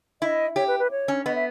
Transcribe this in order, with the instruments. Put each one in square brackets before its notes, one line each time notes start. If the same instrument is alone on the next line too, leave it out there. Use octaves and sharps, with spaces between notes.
[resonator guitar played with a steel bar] E4 [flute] D#5
[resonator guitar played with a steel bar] G4 [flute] C#5
[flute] B4
B4
C#5
[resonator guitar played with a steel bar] C#4
[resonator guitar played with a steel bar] B3 [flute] D#5
[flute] E5